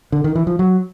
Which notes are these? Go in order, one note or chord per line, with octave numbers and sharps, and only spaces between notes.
D3
D#3
E3
F3
F#3